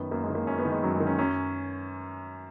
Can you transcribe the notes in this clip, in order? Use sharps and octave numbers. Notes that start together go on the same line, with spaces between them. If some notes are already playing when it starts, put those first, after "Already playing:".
Already playing: F#2 D#3 B3
F#2 A#3
G#3
D#3
A#3
F#2 C#4
B3
D#3
G#3
F#2 F#3
G#3
D#3
C#4
F#2 C#4